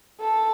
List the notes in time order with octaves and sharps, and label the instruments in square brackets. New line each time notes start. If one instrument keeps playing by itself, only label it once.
[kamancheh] A4